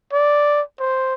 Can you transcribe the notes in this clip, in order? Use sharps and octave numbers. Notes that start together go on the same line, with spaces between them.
D5
C5